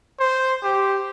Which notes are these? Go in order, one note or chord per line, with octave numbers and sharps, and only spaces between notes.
C5
G4